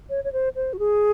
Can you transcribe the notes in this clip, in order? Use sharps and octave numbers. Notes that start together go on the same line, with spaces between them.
C#5
C#5
C5
C5
F#4
G#4